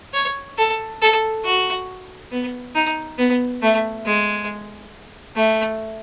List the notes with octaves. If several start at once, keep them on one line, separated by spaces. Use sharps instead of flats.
C#5
A4
A4
F#4
B3
D#4
B3
A3
G#3
A3